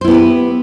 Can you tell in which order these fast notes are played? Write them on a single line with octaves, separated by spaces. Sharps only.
C5 E4 B3 G4 B4